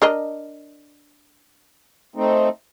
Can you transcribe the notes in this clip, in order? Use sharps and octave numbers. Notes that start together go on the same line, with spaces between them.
D4 A#4 D#5
A3 C4 D#4